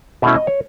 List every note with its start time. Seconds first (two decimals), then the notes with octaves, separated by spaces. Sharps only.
0.22 B2 A3 C#4 E4 E5
0.35 D#5
0.47 C#5